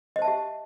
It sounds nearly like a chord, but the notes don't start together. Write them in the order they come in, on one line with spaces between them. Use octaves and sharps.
D#5 C5 A5 E5 G4